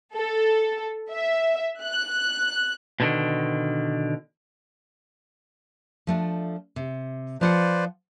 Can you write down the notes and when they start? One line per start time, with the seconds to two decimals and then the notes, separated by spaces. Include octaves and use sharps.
0.15 A4
1.11 E5
1.82 F#6
3.00 B2 D3 D#3
6.07 F3 A3 D4
6.76 C3
7.41 F3 F4 B4 C5 D5 F#5